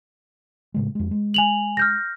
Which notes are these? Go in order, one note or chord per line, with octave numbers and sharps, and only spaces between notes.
A2 C#3 G#3
F2 G#3
G#3
G#5 F7 F#7
F6 G6 A#6